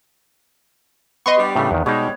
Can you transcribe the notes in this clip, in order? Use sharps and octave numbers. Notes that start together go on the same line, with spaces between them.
B3 D#5 C6 C#6
G3 D4 G4
A2 C#3 A3
E2 D#3
B2 G3 G#3 D#4 C#5